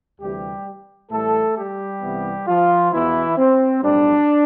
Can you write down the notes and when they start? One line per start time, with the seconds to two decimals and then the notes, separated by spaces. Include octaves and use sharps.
0.21 D2 C3 E3 G3 G4
1.11 A2 E3 G3 A3 A4
1.57 G3 G4
2.02 C2 C3 E3 B3
2.47 F3 F4
2.92 E2 B2 E3 B3 E4
3.38 C4
3.83 B1 A2 G3 D4